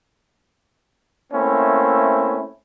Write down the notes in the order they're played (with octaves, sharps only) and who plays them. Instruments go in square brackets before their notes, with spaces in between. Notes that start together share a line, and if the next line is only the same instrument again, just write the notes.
[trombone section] A3 A#3 C4 C#4 E4